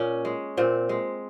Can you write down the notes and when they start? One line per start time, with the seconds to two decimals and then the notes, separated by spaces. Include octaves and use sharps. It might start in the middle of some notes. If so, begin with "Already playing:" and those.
Already playing: A#2 C#4
0.25 G#3
0.57 A#2 C4
0.89 G#3